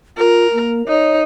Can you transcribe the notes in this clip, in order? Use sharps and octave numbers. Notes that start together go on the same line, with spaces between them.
F4 A#4
A#3
D#4 C#5